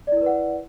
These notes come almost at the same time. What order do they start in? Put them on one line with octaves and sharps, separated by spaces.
D5 E4 A#4 B4 F#5